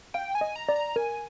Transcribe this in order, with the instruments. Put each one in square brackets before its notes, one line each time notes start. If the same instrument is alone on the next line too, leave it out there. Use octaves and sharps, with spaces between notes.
[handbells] F5 [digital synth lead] G5
[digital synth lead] G#5
[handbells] D#5
[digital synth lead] A#5
[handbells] D5
[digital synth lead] A#5
[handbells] A#4 [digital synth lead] G#5